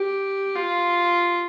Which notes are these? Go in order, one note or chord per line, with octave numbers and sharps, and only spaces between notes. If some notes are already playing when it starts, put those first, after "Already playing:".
Already playing: G4
F4